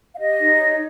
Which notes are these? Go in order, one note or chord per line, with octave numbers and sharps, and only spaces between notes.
F5
G4 D#5
D#4
C#5